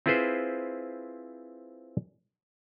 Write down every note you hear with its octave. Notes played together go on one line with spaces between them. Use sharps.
C4 E4 F4 G#4 B4 C5